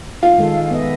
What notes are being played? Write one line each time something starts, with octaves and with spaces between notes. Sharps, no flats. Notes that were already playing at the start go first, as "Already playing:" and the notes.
F4 F5
D#3 G#3 A4
B3 D#5 E5